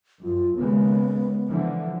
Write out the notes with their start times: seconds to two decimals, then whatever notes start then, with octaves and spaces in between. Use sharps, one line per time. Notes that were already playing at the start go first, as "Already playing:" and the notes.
0.24 F#2 F4
0.56 D#2 C#3 G#3 B3
1.48 D3 E3 F3